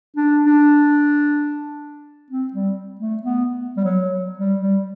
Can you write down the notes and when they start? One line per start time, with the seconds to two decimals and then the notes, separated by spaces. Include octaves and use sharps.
0.16 D4
0.46 D4
2.30 C4
2.53 G3
2.99 A3
3.23 B3
3.77 G3
3.84 F#3
4.37 G3
4.60 G3